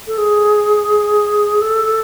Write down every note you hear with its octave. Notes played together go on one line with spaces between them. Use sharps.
A4
G#4
A4